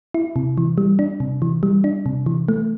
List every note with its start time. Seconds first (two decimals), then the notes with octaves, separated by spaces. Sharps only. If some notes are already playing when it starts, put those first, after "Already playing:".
0.14 E4
0.36 C3
0.58 E3
0.78 G3
0.99 D4
1.20 C3
1.42 E3
1.63 G3
1.84 D4
2.06 C3
2.26 E3
2.48 A3